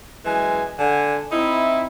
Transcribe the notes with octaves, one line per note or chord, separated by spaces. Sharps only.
F#2 E3 G#3 G#5
D3 G#5
C4 D#4 E4